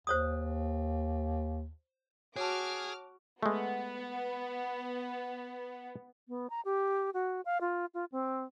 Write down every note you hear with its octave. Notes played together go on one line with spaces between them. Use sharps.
D#2 C5 C#5 D#6
F#4 G#4 C#5 A5 D6 F6
G#3 A3 B3
B3
A#5
G4
F#4
F5
F4
F4
C4